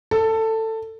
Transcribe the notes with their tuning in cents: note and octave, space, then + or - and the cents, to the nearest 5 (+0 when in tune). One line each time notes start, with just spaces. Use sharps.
A4 +15